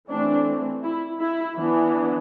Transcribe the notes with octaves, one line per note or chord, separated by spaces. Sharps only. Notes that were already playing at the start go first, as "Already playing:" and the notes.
E3 A3 C4 D4
E4
E4
E3 B3 D4